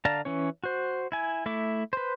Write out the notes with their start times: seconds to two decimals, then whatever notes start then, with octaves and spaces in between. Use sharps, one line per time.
0.05 D3 D5 F5 A5 A#5
0.25 E3 C#4 C#5
0.64 F#4 C5
1.12 E4 G#5
1.46 A3 E4 E5 D6
1.93 B4 C5